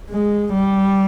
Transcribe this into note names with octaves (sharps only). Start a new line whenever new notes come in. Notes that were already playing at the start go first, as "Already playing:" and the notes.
G#3
G3